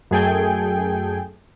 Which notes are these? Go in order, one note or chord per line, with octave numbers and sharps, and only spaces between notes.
F#2 A3 G#4 A4 G5 G#5